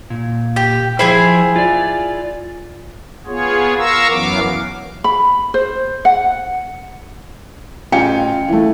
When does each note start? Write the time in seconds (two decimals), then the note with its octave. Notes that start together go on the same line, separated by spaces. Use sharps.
0.10 A#2
0.56 G4
0.99 F3 E4 G#4 C5 G#5
1.56 F4 D5
3.26 B3 F4 G#4 C#5
3.78 A#4 F5 A#5 C#6 E6
4.09 F#2 E3 F#3 B3 F5 D6
5.04 B5
5.54 C5
6.05 F#5
7.92 A1 F4 F5 G5 G#5 C#7
8.48 E3 A3